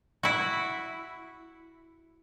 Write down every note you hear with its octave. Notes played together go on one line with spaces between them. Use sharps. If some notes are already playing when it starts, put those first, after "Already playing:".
E4 F#4